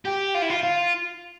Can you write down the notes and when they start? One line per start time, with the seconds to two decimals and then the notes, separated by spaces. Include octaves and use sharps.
0.05 G4
0.35 F4
0.42 E4
0.50 F4
0.63 F4